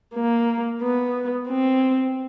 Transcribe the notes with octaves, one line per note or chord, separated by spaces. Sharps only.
A#3
B3
C4